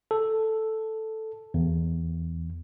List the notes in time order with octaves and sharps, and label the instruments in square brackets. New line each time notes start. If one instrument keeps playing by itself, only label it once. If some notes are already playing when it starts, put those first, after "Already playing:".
[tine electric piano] A4
E2